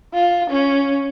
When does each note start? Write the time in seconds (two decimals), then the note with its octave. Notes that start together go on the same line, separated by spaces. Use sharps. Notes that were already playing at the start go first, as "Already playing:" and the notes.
0.14 F4
0.50 C#4